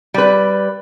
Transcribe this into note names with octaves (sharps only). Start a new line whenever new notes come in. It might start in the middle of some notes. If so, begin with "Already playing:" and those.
G3 B4